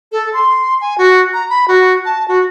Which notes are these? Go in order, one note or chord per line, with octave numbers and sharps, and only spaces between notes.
A4
C6
G#5
F#4
A#5
B5
F#4
A5
F#4